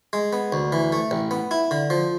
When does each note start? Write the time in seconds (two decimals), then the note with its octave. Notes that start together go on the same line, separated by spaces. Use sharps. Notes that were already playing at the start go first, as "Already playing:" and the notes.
0.13 G#3
0.33 B3
0.52 D2
0.72 E3
0.92 A3
1.11 A1
1.31 B3
1.51 E4
1.71 D3
1.90 F3